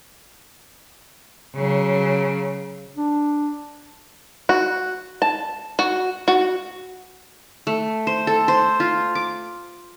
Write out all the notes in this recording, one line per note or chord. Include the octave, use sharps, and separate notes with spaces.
C#3 F#3
D4
F#4
A5
F#4
F#4
A3
C5
A4
C5
F4
D6